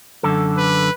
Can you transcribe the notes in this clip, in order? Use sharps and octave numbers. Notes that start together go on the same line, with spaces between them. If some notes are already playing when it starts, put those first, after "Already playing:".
F#2 D3 A4
B4